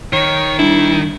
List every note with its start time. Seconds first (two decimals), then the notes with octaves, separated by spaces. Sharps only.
0.13 D#3 C#5
0.59 G3 D4 E4